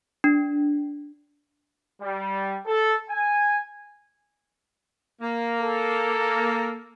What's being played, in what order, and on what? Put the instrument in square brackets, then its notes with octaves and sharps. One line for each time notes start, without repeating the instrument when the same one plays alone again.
[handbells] D4
[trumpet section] G3
A4
G#5
[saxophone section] A#3
[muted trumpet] A4